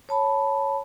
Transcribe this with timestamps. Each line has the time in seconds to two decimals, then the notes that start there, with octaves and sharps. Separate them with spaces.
0.09 C#5 A5 B5